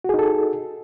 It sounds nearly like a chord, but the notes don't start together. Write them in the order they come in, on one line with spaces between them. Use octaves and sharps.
F#4 G#4 D#4 A4